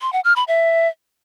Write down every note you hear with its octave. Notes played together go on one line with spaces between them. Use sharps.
C6
F#5
F6
B5
E5